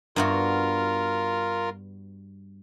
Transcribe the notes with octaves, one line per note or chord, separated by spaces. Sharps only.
G2 B3 F4 F#4 A#4